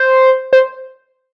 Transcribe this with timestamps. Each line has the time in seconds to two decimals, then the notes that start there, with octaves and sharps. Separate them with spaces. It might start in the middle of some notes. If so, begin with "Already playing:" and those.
Already playing: C5
0.53 C5